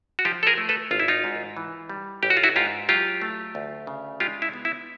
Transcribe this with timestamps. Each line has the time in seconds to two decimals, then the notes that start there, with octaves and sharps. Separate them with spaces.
0.19 F#4
0.25 F3 F4 G4
0.43 A4
0.47 G#4 A#4
0.58 A3
0.69 A4 B4
0.91 G#1 F4
1.00 E4
1.08 D#4 F4
1.24 G#2
1.57 E3
1.89 G3
2.23 A1 G4
2.30 F#4
2.37 F4
2.43 E4 F#4
2.56 G#2 F4 G4
2.89 F#3 F4 G4
3.22 A3
3.55 D2
3.87 C#3
4.20 G#3 F4 G4
4.42 E4
4.54 B3
4.65 E4